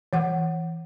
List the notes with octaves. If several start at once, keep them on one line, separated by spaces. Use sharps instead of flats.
E3 F#5